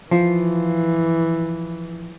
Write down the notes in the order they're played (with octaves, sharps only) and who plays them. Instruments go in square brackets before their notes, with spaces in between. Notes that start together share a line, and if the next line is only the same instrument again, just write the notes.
[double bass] E3 [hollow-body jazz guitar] F3